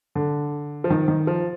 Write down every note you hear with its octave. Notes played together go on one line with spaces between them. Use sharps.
D3
F3
D#3
D#3
F3